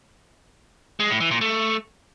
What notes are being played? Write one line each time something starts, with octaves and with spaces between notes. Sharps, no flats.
G#3
A2
E3
A#2
A3